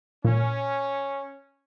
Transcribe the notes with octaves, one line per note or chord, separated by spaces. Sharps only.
A#2 C#4